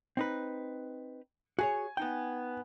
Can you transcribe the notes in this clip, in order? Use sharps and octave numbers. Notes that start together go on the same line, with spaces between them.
C4 D#4 B4
F#4 G#4 C#5 G#5
B3 D#4 G5